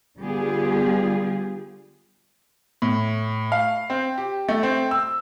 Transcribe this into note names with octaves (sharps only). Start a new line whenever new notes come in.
D3 G3 B3 F4 G4 G#4
A2
F5
C4
G4
A3
C4
E6